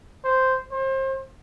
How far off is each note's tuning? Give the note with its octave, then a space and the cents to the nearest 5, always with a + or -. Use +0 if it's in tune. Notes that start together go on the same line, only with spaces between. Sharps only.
C5 -5
C5 +35